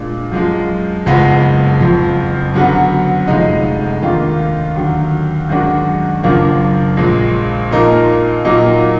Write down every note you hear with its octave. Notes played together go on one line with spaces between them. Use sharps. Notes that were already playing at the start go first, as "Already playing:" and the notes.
Already playing: A#2 G#3 D4
F#2 F3 G#3
F#1 F2 F3 G#3 B3
F#1 F2 F3
F#2 D3 F#3 B3
F1 F2 F3 G#3 D#4
D#2 D#3 A#3 D4 F4
D#2 D3 F#3
F#2 D#3 G#3 D4 F#4
F#1 F#2 F3 A#3 D4
A#1 A#2 G#3
A#2 F3 A#3 D#4 A#4
A#2 F#3 A#3 D#4